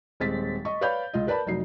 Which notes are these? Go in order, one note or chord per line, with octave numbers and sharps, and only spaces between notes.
D#1 G#3 C4 A6 B6
D#5 C#6
B4 C#5 D5 F5 B5 G6
C#2 F4 D#5
A#4 B4 D5 A5 B5
F1 F#3 D#4 C7